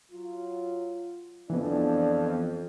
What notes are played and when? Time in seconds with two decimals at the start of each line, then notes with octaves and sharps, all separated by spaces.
0.12 F#3 F4
1.50 F2 E3 B3 D4